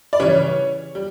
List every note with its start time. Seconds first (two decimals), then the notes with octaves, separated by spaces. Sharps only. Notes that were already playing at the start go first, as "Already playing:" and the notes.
0.13 D5
0.20 C#3 E3 G3 C#5
0.95 G3